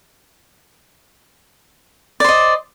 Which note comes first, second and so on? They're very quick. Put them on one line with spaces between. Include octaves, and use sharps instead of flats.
D5 C5 D#5